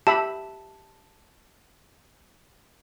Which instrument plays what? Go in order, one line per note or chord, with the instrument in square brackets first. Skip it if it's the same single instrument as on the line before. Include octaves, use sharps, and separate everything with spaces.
[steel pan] G4 E5 B5 [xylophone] A5